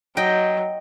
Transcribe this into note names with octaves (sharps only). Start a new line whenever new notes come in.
F#3 D#5 G5